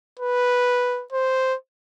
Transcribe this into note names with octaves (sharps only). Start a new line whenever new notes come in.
B4
C5